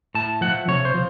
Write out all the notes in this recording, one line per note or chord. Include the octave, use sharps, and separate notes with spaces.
A2 A5
F3 A3 F#5
C3 C#5
C5
F3